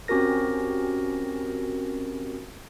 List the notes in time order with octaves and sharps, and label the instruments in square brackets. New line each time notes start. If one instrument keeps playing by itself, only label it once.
[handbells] C4 C#4 F#4 G4 A#4 A#6